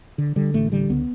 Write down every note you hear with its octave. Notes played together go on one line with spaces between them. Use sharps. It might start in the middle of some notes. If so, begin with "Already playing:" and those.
D3
D3 G3
A1 A3
D3 G3
C#2 B3